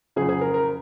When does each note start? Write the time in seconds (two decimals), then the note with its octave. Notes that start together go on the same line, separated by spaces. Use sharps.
0.16 F#1 F2 C#3 F#3 G#4
0.29 G#4
0.41 A#4
0.54 A#4